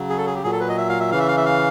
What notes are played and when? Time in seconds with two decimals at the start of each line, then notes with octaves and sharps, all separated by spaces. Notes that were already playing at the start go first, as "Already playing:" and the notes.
Already playing: C#3 F#3
0.10 G#4
0.18 A4
0.27 G#4
0.35 G4
0.44 A#2 F#3 G#4
0.52 A4
0.61 B4
0.69 D#5
0.78 E5
0.89 F5
1.00 E5
1.12 C#3 E3 F5
1.20 E5
1.28 F5
1.37 E5
1.46 F5